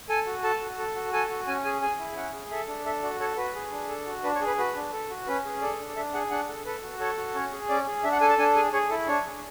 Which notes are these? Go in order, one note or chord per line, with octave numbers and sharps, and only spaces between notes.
A4 G#5
F#4
A4 A5
F#4
A4
F#4
A4 G#5
F#4
C#4 G#5
G#4 G#5
G#4 G#5
E4
C#4 F#5
G#4
A4 E5
D4
A4 E5
F#4 D5
A4 C#5
F#4 B4
G#4
D4
A4
F#4
D4 B4
C#5
G#4
B4
F#4 B4
D4
A4
F#4
C#4 B4
G#4
A4 D5
D4
D4 E5
G#4 F#5
D4 F#5
A4
A4 B4
F#4
A4 C#5
F#4
C#4 C#5
G#4
C#4 D5
G#4
D4 E5
F#5
A4 G#5
A5
D4 G#5
G#4 G#5
G#4 C#5
E4 A4
D4 C#5
G#4